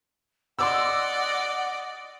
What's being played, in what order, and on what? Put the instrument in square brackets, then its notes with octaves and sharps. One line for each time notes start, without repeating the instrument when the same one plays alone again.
[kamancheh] D5 D#5 [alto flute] F#5 [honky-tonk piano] C6 D6 E6